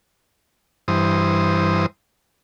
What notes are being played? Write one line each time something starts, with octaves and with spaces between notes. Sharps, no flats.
G2 E3 C5 D#6